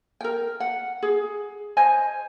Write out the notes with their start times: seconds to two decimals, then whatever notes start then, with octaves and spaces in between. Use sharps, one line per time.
0.21 A#4 G5
0.60 F#5
1.02 G#4
1.77 C5 D#5 G#5